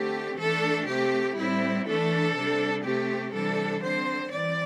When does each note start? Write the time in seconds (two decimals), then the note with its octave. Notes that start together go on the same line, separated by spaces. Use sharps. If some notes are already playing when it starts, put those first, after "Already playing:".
Already playing: D3 A3 C4 G4
0.38 E3 A3 D4 A4
0.88 C3 A3 C4 G4
1.37 A2 G3 C4 E4
1.86 E3 A3 D4 A4
2.35 C3 G3 D4
2.84 C3 A3 C4 G4
3.33 C3 E3 G3 D4 A4
3.83 D3 C4 C5
4.32 E3 C4 D5